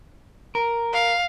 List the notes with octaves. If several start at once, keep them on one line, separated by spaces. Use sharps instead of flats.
A#4
F5